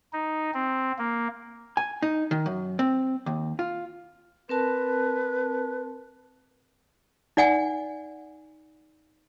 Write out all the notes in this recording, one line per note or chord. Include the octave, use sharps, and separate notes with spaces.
D#4
C4
A#3
G#5
D#4
D#3
F#2
C4
D#2
F4
C4 A#4 B4 A5
D#4 D5 F#5 G#5